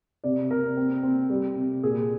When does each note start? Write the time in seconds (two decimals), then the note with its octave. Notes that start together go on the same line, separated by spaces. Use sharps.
0.24 C3 D5
0.51 C3 A#4
0.77 C4
1.03 C4
1.30 G3
1.56 C3
1.83 A#2 G#4